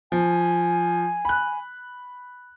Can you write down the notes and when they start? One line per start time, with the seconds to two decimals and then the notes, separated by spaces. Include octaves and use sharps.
0.12 F3 G#5
1.25 B5 F#6